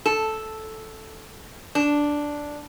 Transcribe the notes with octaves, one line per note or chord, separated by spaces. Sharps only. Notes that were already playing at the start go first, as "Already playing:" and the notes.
A4
D4